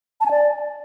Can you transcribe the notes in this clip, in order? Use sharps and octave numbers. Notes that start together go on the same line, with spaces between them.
A5
G#5
D5